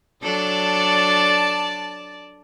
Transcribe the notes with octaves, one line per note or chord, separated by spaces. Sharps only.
F#3 D4 A4 D5 A5